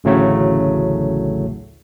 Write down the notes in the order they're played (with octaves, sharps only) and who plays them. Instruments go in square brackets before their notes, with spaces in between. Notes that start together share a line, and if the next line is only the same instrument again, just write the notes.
[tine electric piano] A1 D2 A2 C#3 F#3 A3